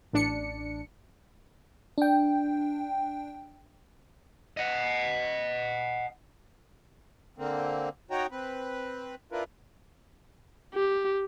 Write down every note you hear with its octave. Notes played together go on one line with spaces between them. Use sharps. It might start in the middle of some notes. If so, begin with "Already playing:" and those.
A1 D4 C#7
D4 G5
D#5 F#5
D3 A#3 C4
D#4 F#4 C#5 G5 A#5
C4 B4
D4 E4 F4 A#4 B4
G4